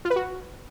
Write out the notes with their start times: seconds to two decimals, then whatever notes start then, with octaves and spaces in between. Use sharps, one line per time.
0.05 F4
0.10 B4
0.16 F#4